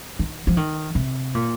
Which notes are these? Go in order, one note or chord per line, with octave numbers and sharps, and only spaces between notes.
D#3
F3
D#3
C3
A#2